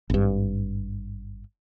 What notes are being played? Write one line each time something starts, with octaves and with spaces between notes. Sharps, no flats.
G#1 G2